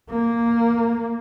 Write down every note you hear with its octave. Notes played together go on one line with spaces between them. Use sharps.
A#3